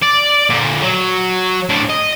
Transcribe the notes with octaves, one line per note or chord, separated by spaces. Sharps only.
D5
A#2 D3
F#3
A2 D4
D#5